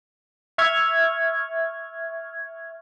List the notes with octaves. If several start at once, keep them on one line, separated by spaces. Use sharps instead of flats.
E5 C#6 F6 G#6